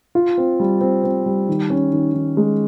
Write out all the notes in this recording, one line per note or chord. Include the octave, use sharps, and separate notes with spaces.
F4
C4
G3
C4
C4
G3
D#3
C#4
D#3
D#3
G#3